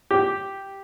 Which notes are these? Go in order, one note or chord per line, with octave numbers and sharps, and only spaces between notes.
G4